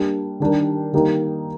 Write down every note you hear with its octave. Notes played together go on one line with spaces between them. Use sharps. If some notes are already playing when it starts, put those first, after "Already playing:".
Already playing: G3 A#3 D4
D#3 G3 D4 G4 A#4
D#3 G3 A#3 D#4